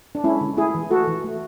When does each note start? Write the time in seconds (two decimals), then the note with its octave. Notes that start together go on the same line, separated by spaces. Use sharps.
0.15 D4
0.24 G#3 C#4 E4
0.41 D3
0.57 A3 E4 G#4
0.75 E3
0.91 A3 F#4 A4
1.08 E3
1.24 A3